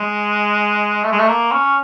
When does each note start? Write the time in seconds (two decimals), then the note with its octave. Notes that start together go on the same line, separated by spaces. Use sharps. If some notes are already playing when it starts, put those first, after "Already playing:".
Already playing: G#3
1.04 A3
1.12 G#3
1.19 A3
1.28 A#3
1.52 C#4